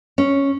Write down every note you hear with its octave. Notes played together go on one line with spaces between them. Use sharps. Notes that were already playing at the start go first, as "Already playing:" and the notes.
C#4